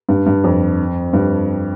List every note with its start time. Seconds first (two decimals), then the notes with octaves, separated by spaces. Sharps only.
0.09 G2
0.26 G2
0.44 F2
1.13 G2